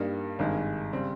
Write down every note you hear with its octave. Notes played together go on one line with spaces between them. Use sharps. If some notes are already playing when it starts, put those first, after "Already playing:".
Already playing: G2 G3 A#3 D#4
G#1 G2 D#3 G#3
C#3 G3 C4